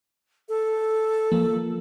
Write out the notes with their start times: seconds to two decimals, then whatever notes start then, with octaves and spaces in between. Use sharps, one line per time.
0.49 A4
1.32 F3 A#3